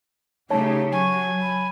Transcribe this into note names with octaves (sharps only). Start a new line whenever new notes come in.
C#3 A3 D#4 G4 C#5 A5
F#3 G#5 C#6
B5